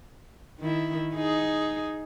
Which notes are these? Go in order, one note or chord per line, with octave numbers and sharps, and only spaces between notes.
D#3 E4
D#4 G#4